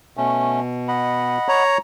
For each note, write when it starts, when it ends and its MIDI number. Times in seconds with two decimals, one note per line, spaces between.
0.17 1.38 47
0.17 0.60 57
0.17 0.60 61
0.88 1.63 75
0.88 1.63 78
0.88 1.63 83
1.48 1.78 73
1.48 1.78 82